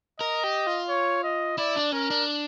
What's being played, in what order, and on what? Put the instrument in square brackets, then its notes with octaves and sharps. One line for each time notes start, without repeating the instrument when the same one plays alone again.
[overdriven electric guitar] A#4 [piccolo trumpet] D#5
[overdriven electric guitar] G4
F4
[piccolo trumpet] C#5
D#5
[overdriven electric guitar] E4 [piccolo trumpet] D5
[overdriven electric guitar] D4
[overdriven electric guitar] C#4 [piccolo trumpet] A#4
[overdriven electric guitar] D4